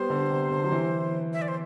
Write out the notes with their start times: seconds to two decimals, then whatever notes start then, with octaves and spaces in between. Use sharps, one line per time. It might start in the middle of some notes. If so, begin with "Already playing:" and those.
Already playing: G3 B3 C5
0.10 D3
0.30 C3
0.51 D3
0.64 F#3
0.72 E3
1.33 E5
1.42 D5
1.48 C5